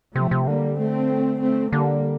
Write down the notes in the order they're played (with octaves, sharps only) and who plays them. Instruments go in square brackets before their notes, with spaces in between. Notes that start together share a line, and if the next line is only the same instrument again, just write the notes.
[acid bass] C3 [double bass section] F3 A3
[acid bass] C3
[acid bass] D3 [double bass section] G3 A#3
[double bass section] A3 C4
A3 C4
[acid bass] D3 [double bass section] G3 A#3